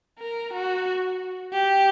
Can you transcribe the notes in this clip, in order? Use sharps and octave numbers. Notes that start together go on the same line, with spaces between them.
A#4
F#4
G4